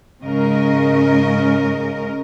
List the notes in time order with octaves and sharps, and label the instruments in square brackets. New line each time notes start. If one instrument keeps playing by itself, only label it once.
[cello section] G#2 C#3 C#4 A#4 D#5